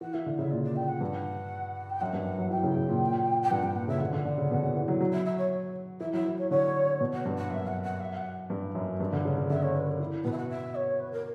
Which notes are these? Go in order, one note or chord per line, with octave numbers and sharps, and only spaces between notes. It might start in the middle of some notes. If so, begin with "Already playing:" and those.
E3 F#5
E3 E5
D3
C#3 E5
A#2 D5
D5
G5
F#5
G2
G5
F#2 F#5
G2
F#3
E3 G5
C#3
C#3
A#2
G5
G2 F#5
G2 G5
A#2 F#5
C#3 E5
D3 F#5
D3
D3
C#3
B2
C#3
E3
F#3
F#3
E5
E5
C#5
E3 E5
F#3 E5
E3
C#5
D3 C#5
B2
F#5
G2
F#5
F#2 E5
F#5
F#5
E5
F#5
G2
F#2
G2
D3
C#3
C#3
D3 E5
C#5
B4
A#4
E3 B3
B2 B4
E5
F#5
E5
C#5
B4
A#4